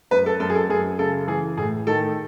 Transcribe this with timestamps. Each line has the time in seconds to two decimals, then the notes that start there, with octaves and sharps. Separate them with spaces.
0.11 F#2 B4
0.26 A4
0.40 F#2 A4
0.50 G#4
0.56 A4
0.69 F#2 G#4
0.99 C#3 A4
1.28 E3 G#4
1.58 A2 G#4
1.87 D#3 A4